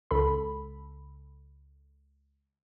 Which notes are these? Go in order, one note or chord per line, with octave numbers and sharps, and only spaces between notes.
C#2 A4 B5